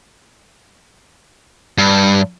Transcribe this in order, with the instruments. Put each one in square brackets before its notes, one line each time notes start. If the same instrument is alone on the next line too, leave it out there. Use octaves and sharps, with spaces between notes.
[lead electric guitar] G2